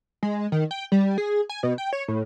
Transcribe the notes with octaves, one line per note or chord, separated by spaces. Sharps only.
G#3
D#3
G5
G3
G#4
G#5
B2
G5
C#5
A2